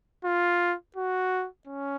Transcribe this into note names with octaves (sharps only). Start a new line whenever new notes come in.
F4
F#4
C#4